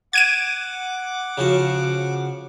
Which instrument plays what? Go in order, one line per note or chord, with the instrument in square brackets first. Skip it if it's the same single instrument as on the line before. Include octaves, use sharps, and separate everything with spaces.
[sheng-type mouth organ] F#5 D6 [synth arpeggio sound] G#6 D7 D#7
[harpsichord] C#3 F3 F#4